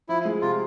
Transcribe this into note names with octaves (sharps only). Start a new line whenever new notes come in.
F3 E4
G#3
C3 F4